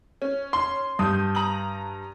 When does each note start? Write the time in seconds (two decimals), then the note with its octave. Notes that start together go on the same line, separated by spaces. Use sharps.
0.22 C#4
0.53 C6
0.99 G2 D#6 G6
1.35 A#5 D#6 F#7